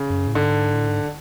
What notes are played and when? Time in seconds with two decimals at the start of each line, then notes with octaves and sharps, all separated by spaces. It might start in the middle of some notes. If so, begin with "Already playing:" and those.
Already playing: C#3
0.10 F#2
0.27 A2
0.35 G#2 D3
0.74 A2
0.88 G#2